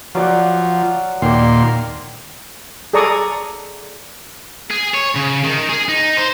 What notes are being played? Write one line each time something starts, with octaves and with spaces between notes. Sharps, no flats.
F3 F#3 D5 F#5
D#2 A#2 D5 G5 C6
G#4 A4 D5 A#5 C#6 D#6
G#4
C#5
C#3
D#3
G#4
D#4
C5